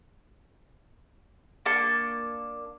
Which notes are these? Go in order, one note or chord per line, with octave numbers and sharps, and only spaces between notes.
A#3 D4 A5 C#6